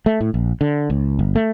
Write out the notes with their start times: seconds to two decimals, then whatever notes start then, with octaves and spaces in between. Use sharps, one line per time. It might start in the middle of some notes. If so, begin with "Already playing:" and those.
0.06 A3
0.21 A2
0.34 A#1
0.61 D3
0.90 C#2
1.19 G1
1.36 A3